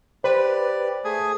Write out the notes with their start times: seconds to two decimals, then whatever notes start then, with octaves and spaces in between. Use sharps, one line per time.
0.24 G4 B4 C5 D5
1.04 A3 G#4 G#5